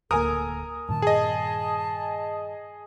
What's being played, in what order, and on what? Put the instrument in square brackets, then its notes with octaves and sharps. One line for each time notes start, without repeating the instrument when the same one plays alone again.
[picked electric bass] D1 D2 A#3 [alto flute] A4 [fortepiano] A#4 G#5 [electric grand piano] D#6
[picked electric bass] G2 A#2 D#3 [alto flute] A5
[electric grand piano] G#4 D#5